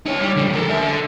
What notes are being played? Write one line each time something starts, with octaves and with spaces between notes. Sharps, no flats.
D#4 C#5
G3
D3 F3
A4 A#4
A#4 E5
D3